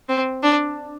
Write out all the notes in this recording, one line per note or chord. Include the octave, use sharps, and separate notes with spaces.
C4
D4